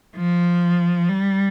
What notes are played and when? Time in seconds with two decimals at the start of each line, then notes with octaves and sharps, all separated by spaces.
0.16 F3
1.09 G3